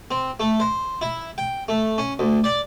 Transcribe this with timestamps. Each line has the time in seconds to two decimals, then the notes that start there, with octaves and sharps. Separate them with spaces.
0.11 C4
0.40 A3
0.60 C5
1.01 E4
1.38 G5
1.68 A3
1.98 C#4
2.19 D2
2.44 D5